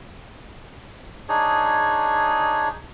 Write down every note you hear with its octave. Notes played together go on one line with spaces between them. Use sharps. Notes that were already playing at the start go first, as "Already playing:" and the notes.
D4 D#4 G#4 C#5